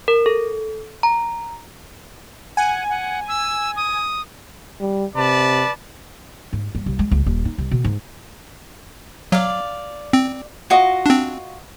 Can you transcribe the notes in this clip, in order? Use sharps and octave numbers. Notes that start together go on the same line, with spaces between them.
A#4
A4
A#5
F#5 G#5
F#5
E6
D#6
G3
C3 B4 D5 A5
G#2
G2
C2
G#3
C#2
D#1
D#4
C2
B2
G#2
F#3 D5 F5
C4
F4 F#4 D#5
C4 D4